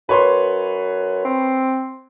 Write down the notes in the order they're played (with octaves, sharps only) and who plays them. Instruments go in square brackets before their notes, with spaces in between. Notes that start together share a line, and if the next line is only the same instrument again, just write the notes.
[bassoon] F#2 [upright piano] B4 C#5 C6
[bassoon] C4